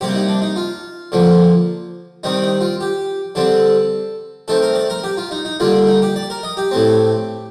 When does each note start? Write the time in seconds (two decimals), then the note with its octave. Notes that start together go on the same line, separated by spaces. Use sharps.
0.01 C3 G3 A#3 G4
0.14 D#4
0.28 D4
0.42 D#4
0.56 F4
1.12 D3 F3 A#3
2.23 D#3 G3 C4 D#4
2.42 D#4
2.61 F4
2.80 G4
3.35 D3 G3 C4 A4
4.48 D#3 A3 C4 A4
4.62 A#4
4.75 D5
4.90 A#4
5.03 G4
5.17 F4
5.31 D#4
5.45 D#4
5.60 D3 G3 A#3 F4
5.87 D#4
6.02 G4
6.16 D5
6.30 A#4
6.43 D#5
6.57 G4
6.71 A2 A3 C4